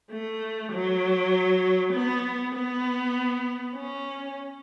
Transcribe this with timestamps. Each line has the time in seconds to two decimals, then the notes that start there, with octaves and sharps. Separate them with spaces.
0.10 A3
0.72 F#3
1.93 B3
2.55 B3
3.76 C#4